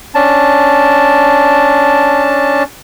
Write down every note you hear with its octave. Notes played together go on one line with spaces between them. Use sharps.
C#4 D4 A5